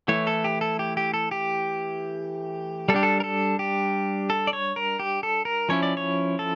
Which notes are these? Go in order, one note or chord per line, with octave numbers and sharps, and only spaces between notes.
E3 A3 E4 C#5
A4
G4
A4
G4
G4
A4
G4
G3 A4
D4 G4
A4
A#4
A4
G4
A4
D5
C#5
A#4
G4
A4
A#4
F3 C#4 E4 C#5
D5
C#5
A4